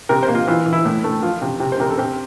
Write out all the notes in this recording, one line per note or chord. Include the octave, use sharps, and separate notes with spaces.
C3 A#4
C5
A#3
F4
E3 F4
E3
E4
A2
A3
F3 F4
C3
C3
C5
C3 A#4
A4
C4 G4